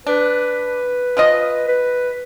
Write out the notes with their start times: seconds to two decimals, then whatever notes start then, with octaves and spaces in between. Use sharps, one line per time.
0.07 D4 B4
1.17 F3 F4 D#5
1.68 B4